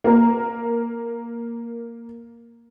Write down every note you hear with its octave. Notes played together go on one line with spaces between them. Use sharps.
A#3 A#4